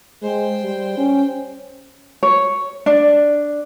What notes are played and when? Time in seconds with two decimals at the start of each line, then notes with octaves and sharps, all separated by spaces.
0.22 G#3 C5 G5
0.63 G3
0.97 C#4
2.23 C#5
2.86 D4